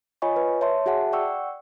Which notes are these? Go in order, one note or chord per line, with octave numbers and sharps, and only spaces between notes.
F4 C#5 D#5 G#5 B5 C#6
B4
C#5 E5 A5 C6
F#4 G#4 E5 F#5 A5
D5 F#5 G5 C#6 E6